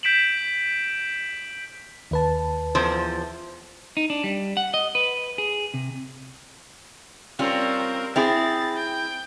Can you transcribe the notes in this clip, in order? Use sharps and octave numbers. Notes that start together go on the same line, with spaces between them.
G6 B6 D7 E7 F#7
D#2 B4 A5
E2 F3 C5
D#4
D4
G3
F#5
D#5
B4
G#4
C3
G3 C4 C#4 F4 A#4
C4 E4 G#4 A6
G5